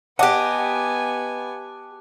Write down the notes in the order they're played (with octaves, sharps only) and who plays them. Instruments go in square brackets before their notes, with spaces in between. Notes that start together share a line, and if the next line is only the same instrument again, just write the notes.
[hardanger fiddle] B3 G#5 [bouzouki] G4 D#5 [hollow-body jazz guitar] F#5 [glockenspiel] A5 D6 F#6